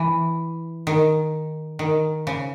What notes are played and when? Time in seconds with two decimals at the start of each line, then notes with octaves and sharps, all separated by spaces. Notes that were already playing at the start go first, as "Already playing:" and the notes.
Already playing: E3
0.87 D#3
1.79 D#3
2.27 C#3